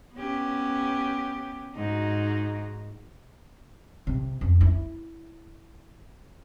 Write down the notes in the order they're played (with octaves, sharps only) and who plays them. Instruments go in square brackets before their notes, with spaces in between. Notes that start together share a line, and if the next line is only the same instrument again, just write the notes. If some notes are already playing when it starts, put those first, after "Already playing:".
[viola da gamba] B3 C#4 G4
G#2 D#4 F#4
[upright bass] C3
F2
E4